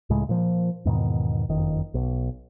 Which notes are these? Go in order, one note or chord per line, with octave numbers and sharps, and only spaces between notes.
C#2 A2 C#3 G#3
A#2 F3
E2 G#2 B2 D#3
F#1 F2 D#3
B1